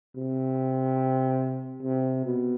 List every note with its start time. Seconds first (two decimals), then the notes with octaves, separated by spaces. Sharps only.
0.16 C3
1.83 C3
2.25 B2